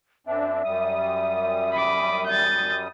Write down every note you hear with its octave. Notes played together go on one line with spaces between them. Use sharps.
F#2 C4 D4 E5
F#2 G3 D#6
B5 D6
G6 A6